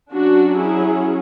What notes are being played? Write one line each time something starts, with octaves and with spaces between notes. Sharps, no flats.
F#3 C#4 D4 F#4
E4 G#4